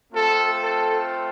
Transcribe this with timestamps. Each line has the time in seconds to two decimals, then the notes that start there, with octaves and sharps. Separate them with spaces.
0.12 A3 C4 F4 A4
0.62 A4